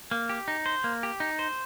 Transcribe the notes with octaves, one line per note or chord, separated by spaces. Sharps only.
A#3
G4
D#4
C5
A#3
G4
D#4
C5